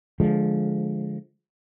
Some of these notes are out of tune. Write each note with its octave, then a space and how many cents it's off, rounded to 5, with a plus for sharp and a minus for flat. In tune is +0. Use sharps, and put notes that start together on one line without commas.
D3 +0 F3 +5 G#3 +15